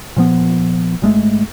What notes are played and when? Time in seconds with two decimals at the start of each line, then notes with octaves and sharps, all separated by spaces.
0.16 A#2 F3 B3
1.02 G#1 G#3 A3